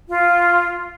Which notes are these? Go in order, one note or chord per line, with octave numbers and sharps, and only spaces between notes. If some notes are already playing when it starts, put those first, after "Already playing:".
F4